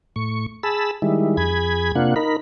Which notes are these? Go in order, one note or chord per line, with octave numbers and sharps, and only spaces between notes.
A2 C#6
G#4 A5 B5 E6
D#3 G3 G#3 E4
F2 G#4 B5 G#6
C3 A#3 D4 F4 F#5
D#4 A#4 B5